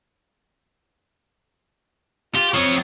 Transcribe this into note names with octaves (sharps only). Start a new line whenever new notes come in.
F4 G4
F3 C4 C#5